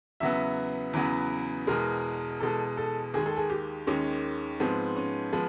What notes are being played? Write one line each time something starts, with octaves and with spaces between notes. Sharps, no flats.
E2 C#3 F#3 B3 E5
E2 C#3 F#3 B3 B4
E2 B2 G#3 A#4
E2 B2 G#3 A4
A4
D#2 D#3 G#3 G#4
A4
G#4
G4
D#2 D#3 G#3 C#4
G#2 F3 G#3 B3 C4
C#4
F3 G#3 B3